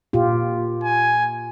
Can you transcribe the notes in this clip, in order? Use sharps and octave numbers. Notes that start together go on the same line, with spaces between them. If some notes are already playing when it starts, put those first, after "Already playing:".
A#2 F4 G4
G#5